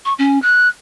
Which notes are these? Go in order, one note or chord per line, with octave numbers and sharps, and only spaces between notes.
C#6
C#4
F#6